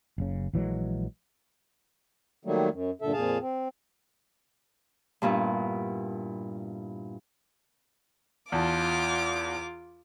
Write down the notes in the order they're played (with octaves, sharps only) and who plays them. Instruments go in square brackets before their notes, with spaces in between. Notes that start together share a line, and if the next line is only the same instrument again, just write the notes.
[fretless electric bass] F#1 C#3
A#1 E3 F#3 G#3
[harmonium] D#3 F#3 G3 A3 A#3
F#2
G2 A#2 D3 A4 E5
F2 A#2 G#4 F5 A5
C4
[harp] G2 A#2 B3 E4
[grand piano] E2 A5 [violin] F4 D6